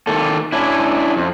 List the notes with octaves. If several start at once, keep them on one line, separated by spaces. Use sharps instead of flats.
D#3 A#3 A4
C#4 D4 E4
F2